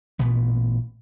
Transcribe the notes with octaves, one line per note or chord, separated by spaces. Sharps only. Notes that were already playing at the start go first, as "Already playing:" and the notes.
A1 A#2 B3